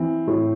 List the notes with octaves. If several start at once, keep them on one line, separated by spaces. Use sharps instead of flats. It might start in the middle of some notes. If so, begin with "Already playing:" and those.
Already playing: E3 C4
A2